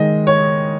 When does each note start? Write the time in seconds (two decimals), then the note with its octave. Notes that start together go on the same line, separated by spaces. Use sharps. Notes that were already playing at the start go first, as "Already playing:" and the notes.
Already playing: D#3 G#3 D#5
0.27 C#5